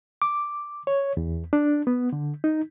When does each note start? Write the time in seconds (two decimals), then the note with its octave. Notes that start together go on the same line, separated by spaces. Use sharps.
0.22 D6
0.87 C#5
1.17 E2
1.53 D4
1.87 B3
2.13 D3
2.44 D#4